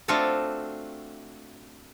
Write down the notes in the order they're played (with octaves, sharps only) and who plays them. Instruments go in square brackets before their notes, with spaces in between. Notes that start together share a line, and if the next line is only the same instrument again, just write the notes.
[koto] A3 C4 D4 F4 F#4 A4